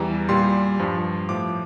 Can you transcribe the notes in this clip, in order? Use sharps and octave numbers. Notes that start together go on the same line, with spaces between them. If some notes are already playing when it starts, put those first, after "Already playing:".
Already playing: E2 E3 G3 A#5
A#2 G3 C6
G2 F3
A2 F3 D6